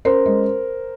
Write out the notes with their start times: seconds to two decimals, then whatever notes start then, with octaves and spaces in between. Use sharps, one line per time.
0.05 C#4 A#4 C5
0.26 G#3